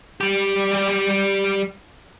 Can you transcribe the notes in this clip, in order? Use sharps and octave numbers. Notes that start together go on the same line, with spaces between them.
G3 G4